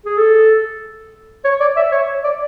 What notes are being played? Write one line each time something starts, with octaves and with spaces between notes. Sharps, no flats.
G#4
A4
C#5
D5
E5
C#5
D5